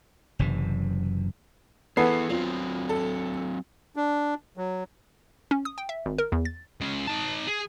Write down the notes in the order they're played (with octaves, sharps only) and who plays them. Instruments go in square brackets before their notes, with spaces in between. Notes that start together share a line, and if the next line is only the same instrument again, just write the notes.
[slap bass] F#1 F#2 C3 E3
[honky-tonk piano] E3 A4 C7 [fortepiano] B3 [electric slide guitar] E4 G#4
[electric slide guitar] F#3 C4 [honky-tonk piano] F4
[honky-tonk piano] A4
[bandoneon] D4
F#3
[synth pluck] C#4
D#6
G5
E5
G#1
A#4
E2
A6
[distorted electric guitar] G#3 C#4
D#4 A5
G#4